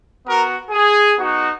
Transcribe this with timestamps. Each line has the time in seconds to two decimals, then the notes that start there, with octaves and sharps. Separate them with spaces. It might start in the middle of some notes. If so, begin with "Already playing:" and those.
0.25 B3 F#4 A#4
0.71 G#4
1.16 B3 D#4 F#4